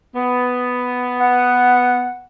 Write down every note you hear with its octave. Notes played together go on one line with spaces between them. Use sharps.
B3
F#5